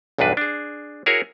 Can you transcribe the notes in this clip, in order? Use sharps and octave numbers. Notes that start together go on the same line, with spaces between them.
B1 E2 G2 D4 B4
D4 G#4
E4 F#4 G#4 A#4 C#5